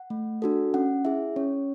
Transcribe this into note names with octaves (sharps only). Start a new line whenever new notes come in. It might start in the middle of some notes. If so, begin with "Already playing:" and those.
Already playing: F#5
A3
D4 F#4 A4
C#4 F#5
E4 G#4 E5
C#4 C#5